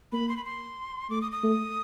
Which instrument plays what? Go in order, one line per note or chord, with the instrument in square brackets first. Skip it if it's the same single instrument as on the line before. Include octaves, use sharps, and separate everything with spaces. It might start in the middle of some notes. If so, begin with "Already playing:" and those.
[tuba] A#3 [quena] B5
[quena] C6
B5
C6
[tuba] A3 [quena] D6
[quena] D#6
D#6
[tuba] A3